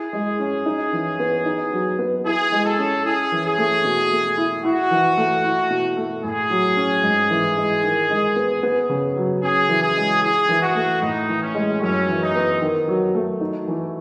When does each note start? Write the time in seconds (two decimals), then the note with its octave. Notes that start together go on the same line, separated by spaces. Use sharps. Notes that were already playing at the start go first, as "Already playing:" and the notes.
Already playing: E4 G#4
0.13 G#3
0.39 C#4
0.66 D#4
0.93 E3
1.19 B3
1.45 D#4
1.72 F#3
1.99 B3
2.25 E4 G#4
2.52 G#3
2.65 A4
2.78 C#4
3.05 E4 G#4
3.32 E3
3.45 G#4
3.58 A3
3.84 B2
4.11 A3
4.37 E4
4.64 E4 F#4
4.91 E3
5.17 A3
5.44 E4
5.70 B2
5.97 A3
6.24 A2 G#4
6.50 F#3
6.77 C#4
7.04 G#2
7.30 E3
7.57 G#3
7.83 D#3
8.10 G#3
8.36 B3
8.63 B3
8.89 C#3
9.16 F#3
9.42 C#4 G#4
9.69 E3
9.82 G#4
9.96 G#3
10.22 E4 G#4
10.49 E3
10.62 F#4
10.75 A3
11.02 A2 D#4
11.29 E3
11.41 C#4
11.55 G#3
11.81 F#2 C#4
12.08 E3
12.22 D#4
12.35 B3
12.61 D#3
12.88 F#3
13.15 A3
13.41 D#4
13.68 E3